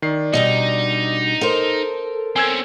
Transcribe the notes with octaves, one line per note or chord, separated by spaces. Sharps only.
D#3 D5 C7
B2 D3 G3 D#4 D#5
A4 A#4 C5
C4 C#4 G#5 E6 G#6